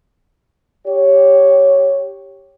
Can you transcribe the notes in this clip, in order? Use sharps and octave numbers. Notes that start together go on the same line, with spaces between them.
G4 C#5